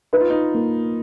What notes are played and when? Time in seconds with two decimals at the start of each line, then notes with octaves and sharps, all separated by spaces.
0.13 D#4 B4
0.21 F4
0.30 D#4
0.54 A#3